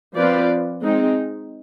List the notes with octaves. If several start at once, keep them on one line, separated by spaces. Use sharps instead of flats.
F3 C4 F4 B4 D5
G#3 C4 D#4